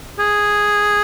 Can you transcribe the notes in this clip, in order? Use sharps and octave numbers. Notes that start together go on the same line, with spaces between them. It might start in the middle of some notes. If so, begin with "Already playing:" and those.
G#4